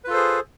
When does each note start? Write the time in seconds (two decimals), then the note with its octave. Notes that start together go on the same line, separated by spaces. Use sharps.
0.04 B4
0.07 F4
0.10 A4
0.13 C5
0.16 G#4